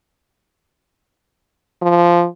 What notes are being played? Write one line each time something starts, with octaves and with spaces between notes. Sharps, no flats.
F3